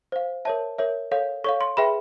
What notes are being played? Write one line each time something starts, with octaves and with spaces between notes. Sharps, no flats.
C5 F5
A#4 C#5 E5 A5
A#4 C#5 E5
A4 C#5 F5
A4 C#5 F5 C#6
C6
G#4 B4 E5 G5 B5